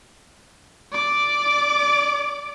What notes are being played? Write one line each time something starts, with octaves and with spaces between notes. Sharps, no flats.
D5 D6